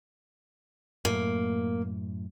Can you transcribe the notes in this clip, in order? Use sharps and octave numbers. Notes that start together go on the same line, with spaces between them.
F#2 A2 A#3